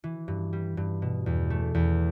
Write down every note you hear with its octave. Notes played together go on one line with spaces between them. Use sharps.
E3
G2
G3
G2
B2
E2
A3
E2